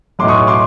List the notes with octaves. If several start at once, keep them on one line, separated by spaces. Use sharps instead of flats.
B1 A2 F#3 C6 D6
C#6 D#6
C6 D6